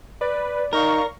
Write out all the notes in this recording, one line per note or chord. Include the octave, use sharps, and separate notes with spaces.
B4 D5
D#4 A#4 F5 C#6 A#6